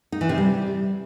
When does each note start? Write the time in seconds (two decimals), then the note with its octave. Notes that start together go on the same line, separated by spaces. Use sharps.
0.12 D#4
0.21 E3
0.29 C3
0.38 G3